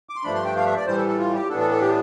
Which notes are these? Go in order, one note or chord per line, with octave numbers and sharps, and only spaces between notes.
D6
C6
G2 F3 A3 D4 B5
C6
G5
F5
E5
D5
A2 E3 G3 C5
A4
A4
F4
G4
A2 E3 B3 D4 A4
A4
A4
G4